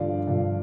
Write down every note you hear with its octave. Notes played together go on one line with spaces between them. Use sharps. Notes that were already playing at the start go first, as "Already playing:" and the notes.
Already playing: G2 D3 F3 D5 F5
G2 D3 F3